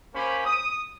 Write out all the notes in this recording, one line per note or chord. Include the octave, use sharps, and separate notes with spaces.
A#3 C#4 G4 C5 B5
D#6